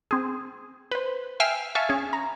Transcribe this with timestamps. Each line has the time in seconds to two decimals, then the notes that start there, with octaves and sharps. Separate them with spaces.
0.11 C4 G#4
0.91 B4 C5
1.40 E5 G5 G#5 E6 F6 C7
1.75 E5 F5 G#5 A5 C#6 F6
1.89 C#4 G#4
2.13 A#5